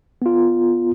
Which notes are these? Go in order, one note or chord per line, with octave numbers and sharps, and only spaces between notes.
B3 F4